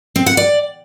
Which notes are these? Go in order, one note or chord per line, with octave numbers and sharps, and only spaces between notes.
C4
F#5
D5